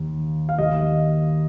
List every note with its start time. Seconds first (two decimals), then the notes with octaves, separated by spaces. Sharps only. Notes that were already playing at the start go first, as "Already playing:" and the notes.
Already playing: D#2
0.49 F5
0.58 D#2 D#3 D#5